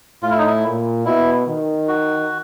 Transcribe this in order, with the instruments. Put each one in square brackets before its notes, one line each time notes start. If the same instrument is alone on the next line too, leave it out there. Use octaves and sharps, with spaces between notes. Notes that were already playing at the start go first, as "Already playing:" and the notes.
[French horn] A2 [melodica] F4
[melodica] E4
D#4
E4
[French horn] A#2
[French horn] B2 [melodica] E4
[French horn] D#3
[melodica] F#4